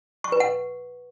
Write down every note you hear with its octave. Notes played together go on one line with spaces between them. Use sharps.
C#6
B4
F#5